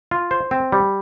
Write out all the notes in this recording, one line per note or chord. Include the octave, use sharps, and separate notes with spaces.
F4
C5
C4
G3